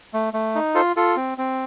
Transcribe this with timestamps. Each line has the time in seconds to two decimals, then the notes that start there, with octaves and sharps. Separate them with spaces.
0.13 A3
0.34 A3
0.55 D#4
0.75 F4 A4 C5
0.96 F4 A4
1.17 C4
1.38 C4